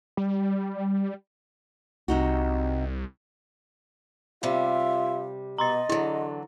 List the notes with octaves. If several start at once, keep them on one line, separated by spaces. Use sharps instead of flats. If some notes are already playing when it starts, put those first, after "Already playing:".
G3
C2 C3 D#4 F#4
C3 G3 F4 E5
B2 D#5 A#5 C6 A6
D3 E3 F#3 E4